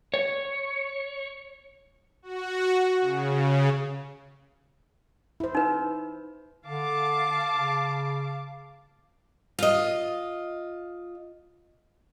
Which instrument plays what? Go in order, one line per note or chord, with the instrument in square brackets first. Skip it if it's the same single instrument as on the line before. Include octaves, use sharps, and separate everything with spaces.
[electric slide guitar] C#5
[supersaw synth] F#4
C#3
[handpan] E4 C5
[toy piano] D#4 B4
[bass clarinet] D3 [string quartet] F5 A5 D6
[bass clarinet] C#3
[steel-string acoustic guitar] F4 D#5